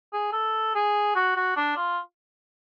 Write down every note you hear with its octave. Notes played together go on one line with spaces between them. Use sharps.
G#4
A4
G#4
F#4
F#4
D4
F4